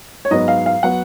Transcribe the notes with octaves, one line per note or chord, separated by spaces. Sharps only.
C#5
G#2 F#3 B3 D#5
F5
F5
F#3 B3 F#5